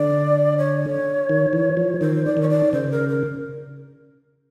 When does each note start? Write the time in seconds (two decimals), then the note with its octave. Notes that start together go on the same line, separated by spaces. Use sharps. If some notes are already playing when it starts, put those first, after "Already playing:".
Already playing: D3 D5
0.58 C#5
1.29 D#3
1.53 E3
1.77 F3
2.00 D#3 C5
2.25 D5
2.37 D#3 C#5
2.49 D5
2.72 C#3 C5
2.91 A#4
3.09 A#4